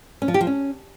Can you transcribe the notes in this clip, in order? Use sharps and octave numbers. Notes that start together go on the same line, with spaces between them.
C#4
F3
G4
F3
C#4